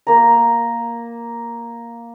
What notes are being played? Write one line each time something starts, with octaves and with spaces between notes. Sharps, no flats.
A#3 A#5